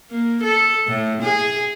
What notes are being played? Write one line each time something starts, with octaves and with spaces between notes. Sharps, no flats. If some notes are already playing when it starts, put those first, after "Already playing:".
A#3
A4
A2
G#4